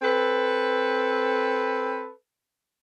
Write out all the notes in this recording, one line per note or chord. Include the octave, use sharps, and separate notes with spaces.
C4 A4 B4